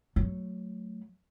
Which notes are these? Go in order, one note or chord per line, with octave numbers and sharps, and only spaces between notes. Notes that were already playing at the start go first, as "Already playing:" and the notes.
F#3 A3